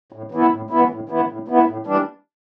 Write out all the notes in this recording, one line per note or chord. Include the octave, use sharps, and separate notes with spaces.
A2
E3 B3 E4
A2
E3 B3 E4
A2
E3 B3 E4
A2
E3 B3 E4
A2
E3 G3 D4